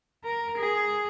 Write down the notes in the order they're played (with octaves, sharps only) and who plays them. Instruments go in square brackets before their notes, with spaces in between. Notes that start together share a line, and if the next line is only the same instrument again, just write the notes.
[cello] A#4
G#4